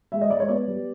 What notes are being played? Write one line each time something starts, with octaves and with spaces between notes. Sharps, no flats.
G#3 E5
D#5
G#3 D5
C#5
B3 D5
G3